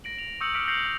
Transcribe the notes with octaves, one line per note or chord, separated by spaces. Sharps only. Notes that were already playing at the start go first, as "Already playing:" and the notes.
A#6 D7 F#7
F7
C#6 D#6 E6 G6 C#7 F#7
D6 F6 B6 C#7 D7
G6 A#6 C7 C#7 F7 F#7
F7